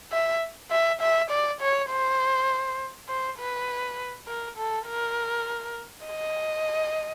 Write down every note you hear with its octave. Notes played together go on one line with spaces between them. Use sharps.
E5
E5
E5
D5
C#5
C5
C5
B4
A#4
A4
A#4
D#5